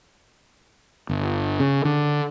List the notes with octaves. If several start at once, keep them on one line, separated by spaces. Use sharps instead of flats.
G1
C#3
D3